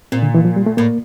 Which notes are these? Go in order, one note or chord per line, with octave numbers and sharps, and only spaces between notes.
A#2 C4
D3
E3
F3
G3
A3
A2 A#3